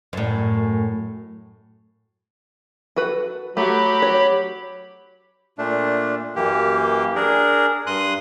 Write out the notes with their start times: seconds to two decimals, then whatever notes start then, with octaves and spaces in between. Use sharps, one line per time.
0.13 F#2 A2
2.96 F#4 A4 B4
3.57 F#3 A3 G4 B5
4.02 C#5
5.58 A#2 A3 D4
6.36 F#2 E3 A#3 G4
7.15 D4 G#4 A#4
7.87 G2 C6 D#6 F#6